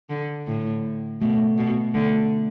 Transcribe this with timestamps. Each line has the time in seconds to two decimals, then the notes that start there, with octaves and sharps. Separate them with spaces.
0.10 D3
0.47 A2 D3
1.22 B2 A3
1.58 B2
1.94 D3 A3